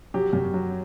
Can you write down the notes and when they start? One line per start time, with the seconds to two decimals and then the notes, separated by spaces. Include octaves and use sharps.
0.14 F#3 G4
0.33 F#2
0.54 F#3